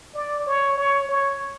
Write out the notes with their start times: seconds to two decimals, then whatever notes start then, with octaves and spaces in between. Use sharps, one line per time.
0.15 D5
0.46 C#5
0.78 C#5
1.09 C#5